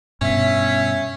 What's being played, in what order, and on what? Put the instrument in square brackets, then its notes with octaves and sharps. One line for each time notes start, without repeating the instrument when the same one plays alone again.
[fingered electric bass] G2 B2 [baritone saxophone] C#4 [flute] E5